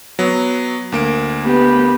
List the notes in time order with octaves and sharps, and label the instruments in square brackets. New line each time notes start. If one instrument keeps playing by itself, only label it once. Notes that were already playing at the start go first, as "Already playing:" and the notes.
[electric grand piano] F#3 B3
D2 A#3 D7
[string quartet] B3 G4 B4